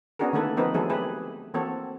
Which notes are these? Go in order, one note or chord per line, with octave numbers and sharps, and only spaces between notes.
B3 C#4 D4 F#4 G#4 A#4
D3 D#3 A3 A#3 A4 B4
F3 B3 C4 D#4 A#4 B4
E3 F#3 A3 E4 G#4 A4
E4 G4 G#4 B4
E3 A#3 C4 F#4 A4 C#5